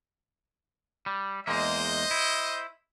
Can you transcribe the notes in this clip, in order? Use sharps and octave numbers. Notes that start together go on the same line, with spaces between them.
G3
E2 G#3 A#3 C5 D#5
E4